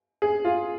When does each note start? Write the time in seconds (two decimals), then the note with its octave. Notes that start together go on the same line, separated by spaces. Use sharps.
0.22 G#4
0.45 F4